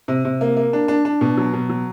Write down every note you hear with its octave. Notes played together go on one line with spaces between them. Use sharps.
C3
C3
A#3
A#3
D4
D4
D4
B2
F#3
B2
F#3